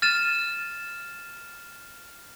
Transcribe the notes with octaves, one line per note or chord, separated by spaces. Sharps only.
F6 A6 D#7 E7